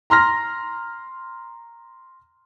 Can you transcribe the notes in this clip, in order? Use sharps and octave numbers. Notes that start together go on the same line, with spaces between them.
A#5 C6 F6 A#6